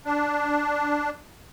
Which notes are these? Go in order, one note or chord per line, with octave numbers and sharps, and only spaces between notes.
D4